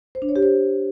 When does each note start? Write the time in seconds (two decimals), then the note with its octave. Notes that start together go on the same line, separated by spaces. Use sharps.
0.15 C5
0.22 D4
0.29 C#5
0.36 G4
0.42 C5